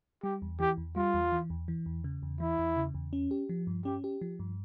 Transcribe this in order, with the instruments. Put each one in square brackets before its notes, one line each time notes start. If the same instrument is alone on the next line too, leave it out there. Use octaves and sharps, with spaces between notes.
[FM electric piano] G3 [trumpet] G4
[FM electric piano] E2
[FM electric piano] E3 [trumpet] G4
[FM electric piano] E2
[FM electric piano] G3 [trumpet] F4
[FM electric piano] E2
E3
E2
E3
E2
C#3
E2
[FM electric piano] E3 [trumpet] E4
[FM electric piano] E2
C#3
E2
C#4
G4
F3
G2
[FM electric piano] C#4 [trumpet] G4
[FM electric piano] G4
F3
G2